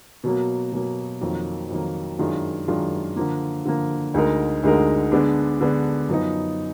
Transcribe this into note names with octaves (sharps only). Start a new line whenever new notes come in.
B2 F#3 A#3
B2 F#3 A#3
F2 D#3 F#3 A#3
F2 D#3 F#3 A#3
F#2 D#3 G#3 D4 F4
F#2 D#3 G#3 D4 F4
D3 F3 A#3
D3 F3 A#3
D2 D3 G#3 D#4 A#4
D2 D3 G#3 D#4 A#4
D3 G#3 B3 D4
D3 G#3 B3 D4
F#2 F3 B3 D#4